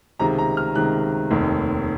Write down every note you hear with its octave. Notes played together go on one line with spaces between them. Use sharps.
C#2 C3 D#3 A#5
A#5
F6
C#2 C3 D#3 F#6
F1 D#2 D#3